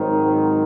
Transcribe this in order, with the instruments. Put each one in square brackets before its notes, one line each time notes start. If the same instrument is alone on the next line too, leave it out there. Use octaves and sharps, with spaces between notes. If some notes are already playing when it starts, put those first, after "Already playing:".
Already playing: [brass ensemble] G#2 D#3 F#3 C4